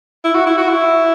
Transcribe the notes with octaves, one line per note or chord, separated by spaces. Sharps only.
E4
F#4
E4
F#4
E4